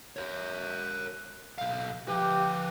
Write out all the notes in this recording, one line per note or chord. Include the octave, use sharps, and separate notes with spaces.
A#4 C#5
B1 F5
F3 G4 B4